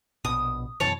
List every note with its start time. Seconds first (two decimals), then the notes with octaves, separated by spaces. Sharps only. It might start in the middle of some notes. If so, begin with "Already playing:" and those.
0.25 A#1 B2 D#6
0.80 F#2 B2 E3 C#5 A5